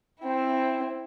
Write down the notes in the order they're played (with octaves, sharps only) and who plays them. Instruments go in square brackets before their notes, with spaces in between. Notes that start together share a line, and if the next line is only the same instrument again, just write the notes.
[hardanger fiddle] C4 E4